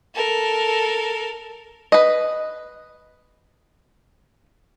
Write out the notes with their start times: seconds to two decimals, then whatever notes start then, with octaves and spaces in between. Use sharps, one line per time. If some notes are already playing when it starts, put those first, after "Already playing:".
0.15 A4 A#4
1.92 B4 D#5